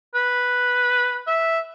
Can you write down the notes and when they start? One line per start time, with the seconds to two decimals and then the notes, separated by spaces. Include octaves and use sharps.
0.15 B4
1.27 E5